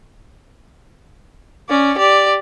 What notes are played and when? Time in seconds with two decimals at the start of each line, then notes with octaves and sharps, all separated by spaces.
1.69 C#4 D5
1.98 G4 D5